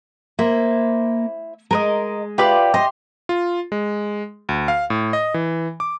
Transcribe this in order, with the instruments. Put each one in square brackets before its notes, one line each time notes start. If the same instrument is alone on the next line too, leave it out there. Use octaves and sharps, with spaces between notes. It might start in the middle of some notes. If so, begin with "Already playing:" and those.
[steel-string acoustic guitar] A#3 [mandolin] E4 C5
[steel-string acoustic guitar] G#3 [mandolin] A#4 B4 D#5
[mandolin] F4 B4 D5 [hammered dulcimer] G4
[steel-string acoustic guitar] D#5 [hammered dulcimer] C6
[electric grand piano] F4
G#3
D2
F5
A2
D#5
E3
D6